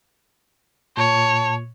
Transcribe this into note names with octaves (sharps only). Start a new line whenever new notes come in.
A#2 C#5 A5